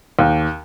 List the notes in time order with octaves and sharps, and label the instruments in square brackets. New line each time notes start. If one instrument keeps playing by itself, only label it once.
[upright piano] D#2